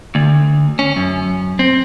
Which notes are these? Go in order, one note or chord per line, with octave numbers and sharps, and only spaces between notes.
D2
C#4
F#2
C4